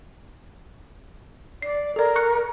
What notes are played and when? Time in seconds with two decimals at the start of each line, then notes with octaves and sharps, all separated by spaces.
1.62 D5 C7
1.96 A4 A#4 D5
2.16 C#6 F#6 C#7